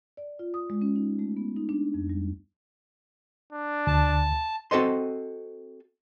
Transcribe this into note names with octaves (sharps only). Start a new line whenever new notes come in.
D5
F4
D#6
G#3
C#4
D#4
A3
B3
D#4
D4
F2
G3
D4
D2 A5
C4 F#4 A4 C5 D#5 C6